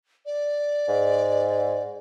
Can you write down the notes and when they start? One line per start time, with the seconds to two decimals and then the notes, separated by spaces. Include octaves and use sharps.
0.26 D5
0.88 G#2